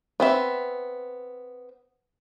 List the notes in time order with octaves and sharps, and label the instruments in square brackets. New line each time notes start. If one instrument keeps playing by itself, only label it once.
[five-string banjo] B3 C4 E5